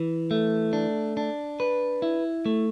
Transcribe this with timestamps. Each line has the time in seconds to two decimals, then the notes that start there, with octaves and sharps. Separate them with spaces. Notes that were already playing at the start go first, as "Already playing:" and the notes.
Already playing: E3
0.31 A3
0.73 D4
1.17 D4
1.60 B4
2.02 E4
2.46 A3